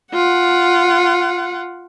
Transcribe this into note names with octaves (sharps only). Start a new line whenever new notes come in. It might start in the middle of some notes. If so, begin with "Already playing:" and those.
F4 F#5